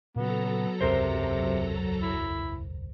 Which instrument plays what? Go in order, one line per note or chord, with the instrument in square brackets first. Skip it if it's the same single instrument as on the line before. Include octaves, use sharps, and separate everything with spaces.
[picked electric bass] A#2 C#3 [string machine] F#3 A4 A#5 [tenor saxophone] B3
[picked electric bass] E1 C#2 F#2 [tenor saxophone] C3 [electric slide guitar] A#4 C5
[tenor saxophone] E4